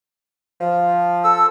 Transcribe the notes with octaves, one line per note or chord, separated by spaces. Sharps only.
F3
A4 E6